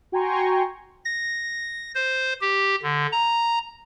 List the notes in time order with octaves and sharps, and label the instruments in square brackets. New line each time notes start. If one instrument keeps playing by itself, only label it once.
[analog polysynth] F#4 G5 G#5 A#5 C6 C#6
[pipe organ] A#6
C5
G4
D3
A#5